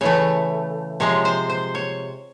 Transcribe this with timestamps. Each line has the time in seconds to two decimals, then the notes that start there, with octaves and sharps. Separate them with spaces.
0.01 C#3 E3 A3 C#5
1.00 C3 F3 G#3 C#5
1.25 C5
1.50 C5
1.75 C#5